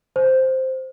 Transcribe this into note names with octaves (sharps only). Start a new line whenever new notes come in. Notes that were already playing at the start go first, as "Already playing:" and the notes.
C5